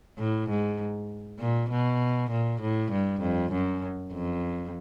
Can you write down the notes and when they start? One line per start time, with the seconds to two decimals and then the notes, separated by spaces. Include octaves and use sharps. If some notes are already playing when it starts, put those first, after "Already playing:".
0.19 A2
0.50 G#2
1.40 A#2
1.70 B2
2.31 A#2
2.61 A2
2.92 G2
3.21 F2
3.52 F#2
4.13 F2